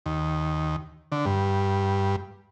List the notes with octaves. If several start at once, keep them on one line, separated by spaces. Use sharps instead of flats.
D#2
D3
G2